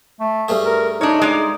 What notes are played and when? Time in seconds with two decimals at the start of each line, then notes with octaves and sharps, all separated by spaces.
0.20 A3
0.48 G2 A3 G#4
0.65 A#4
1.01 D4 D#4 C#5
1.21 G#3 D5